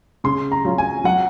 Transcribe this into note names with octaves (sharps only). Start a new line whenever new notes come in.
C#3 C6
A#5
F#3 C#4 F4
G#5
F#3 F#5